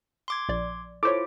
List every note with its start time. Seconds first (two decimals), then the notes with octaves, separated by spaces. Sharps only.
0.28 C6 D6 G#6
0.49 A#1 D5
1.03 E4 F4 A4 C5 C#5 D6